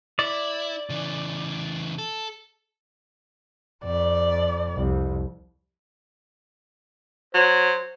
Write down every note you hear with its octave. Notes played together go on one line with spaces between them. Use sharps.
E4 D5
C#3 E3
A4
F2 D5
C2 F2
F#3 C5